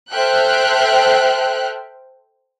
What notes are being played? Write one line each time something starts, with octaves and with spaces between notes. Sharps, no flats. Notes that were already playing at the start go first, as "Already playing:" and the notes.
A4 C5 E5 G5 F6 F#6